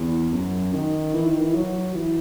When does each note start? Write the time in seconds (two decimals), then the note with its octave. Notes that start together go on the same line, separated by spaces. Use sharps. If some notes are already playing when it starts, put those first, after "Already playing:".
Already playing: E2
0.32 F#2
0.73 D#3
1.14 E3
1.26 D#3
1.40 E3
1.54 F#3
1.95 E3